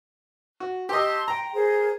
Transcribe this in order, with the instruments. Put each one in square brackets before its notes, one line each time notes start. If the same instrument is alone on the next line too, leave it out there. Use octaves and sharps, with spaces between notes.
[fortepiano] F#4
[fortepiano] G4 D#5 [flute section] A5 C6 E6
[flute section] G5 C6 [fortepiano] A#5
[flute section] G#4 A#4 C5